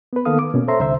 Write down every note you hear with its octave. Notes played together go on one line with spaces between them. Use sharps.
B3 B4
D#3 A#3 B3 A4 F5 D#6
D6
B2 A#3 C#4
A4 C5 C#5 E5 A#5 C6
C2 D3 C5 E5